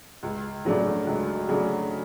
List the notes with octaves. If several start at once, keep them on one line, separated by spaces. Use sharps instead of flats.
C#2
C#3 F#3 A3 D4
C#2
C#3 F#3 A3 D4